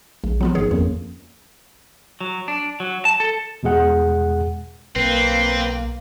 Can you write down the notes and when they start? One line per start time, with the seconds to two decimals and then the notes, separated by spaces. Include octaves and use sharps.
0.24 A#1 G#3
0.41 F3 F#3 B3 F4
0.55 G#1 D#3 B3 G#4 C#5
0.71 F2 F3 A#3 C#4
2.21 F#3
2.48 D4
2.80 F#3
3.05 A5
3.20 A4
3.63 E2 B2 G#3 G#4 F#5
4.96 B1 A#3 C4 B4